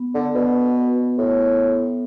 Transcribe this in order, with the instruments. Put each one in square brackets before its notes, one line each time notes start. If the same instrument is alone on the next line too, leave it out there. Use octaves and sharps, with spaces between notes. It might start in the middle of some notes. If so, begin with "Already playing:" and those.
Already playing: [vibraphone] B3
[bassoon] D3
[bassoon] B2 [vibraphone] B3
[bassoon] A2